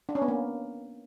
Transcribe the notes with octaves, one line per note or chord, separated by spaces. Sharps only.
D4
C#4
B3
A#3